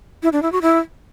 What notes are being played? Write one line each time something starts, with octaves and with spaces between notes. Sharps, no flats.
E4
D4
E4
F#4
E4